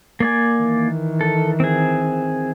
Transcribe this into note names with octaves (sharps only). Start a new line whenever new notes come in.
A#3 D5 G#5
D#3 E3
A4
C4 G#4